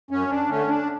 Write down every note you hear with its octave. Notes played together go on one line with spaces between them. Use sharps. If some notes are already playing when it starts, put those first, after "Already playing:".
F#2 C#4
D4
D3 A3 C#4
D4